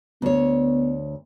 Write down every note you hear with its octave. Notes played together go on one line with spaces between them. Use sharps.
D2 B3 C#5